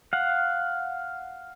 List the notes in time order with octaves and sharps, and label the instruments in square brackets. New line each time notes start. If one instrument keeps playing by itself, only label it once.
[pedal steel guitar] F5 F#5